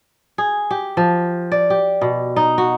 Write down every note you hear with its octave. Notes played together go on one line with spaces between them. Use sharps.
G#4
G4
F3
D5
G4
B2
D#4
F#4